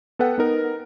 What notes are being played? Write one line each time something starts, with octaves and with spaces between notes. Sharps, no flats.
B3 A4 B4 F#5 G5
B3 D#4 A#4